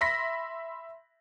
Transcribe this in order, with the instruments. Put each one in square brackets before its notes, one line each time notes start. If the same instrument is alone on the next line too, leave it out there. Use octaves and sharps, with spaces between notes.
[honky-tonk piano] E5 B5 C6 A#6 B6